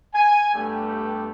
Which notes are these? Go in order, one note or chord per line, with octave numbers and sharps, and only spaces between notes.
G#5
G2 A3 B3 G4